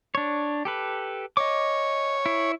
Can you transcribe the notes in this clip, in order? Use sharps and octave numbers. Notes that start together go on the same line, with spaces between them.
D4 C#5
G4 A4 B4
C#5 D#5 D6
E4